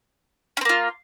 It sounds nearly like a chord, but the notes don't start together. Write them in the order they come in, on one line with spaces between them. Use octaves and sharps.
C#4 C4 A#3 F4